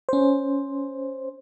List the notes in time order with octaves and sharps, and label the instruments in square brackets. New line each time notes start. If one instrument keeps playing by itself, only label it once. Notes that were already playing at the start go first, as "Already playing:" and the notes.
[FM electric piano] C#4 C5